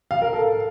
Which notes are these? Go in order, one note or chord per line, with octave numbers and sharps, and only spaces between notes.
F5
A#4
A4